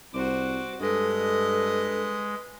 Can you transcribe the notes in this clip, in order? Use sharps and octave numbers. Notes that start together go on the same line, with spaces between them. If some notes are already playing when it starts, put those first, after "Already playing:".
C2 F#4 C5 D6
G2 G#3 A4 B4 D#5